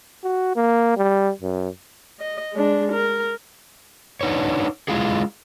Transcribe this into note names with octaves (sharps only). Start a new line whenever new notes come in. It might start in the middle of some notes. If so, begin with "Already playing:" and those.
F#4
A#3
G3
F#2
D#5
G#3 D4
A#4
D4 D#4 B4 C#5
G#3 E4 F4 G#4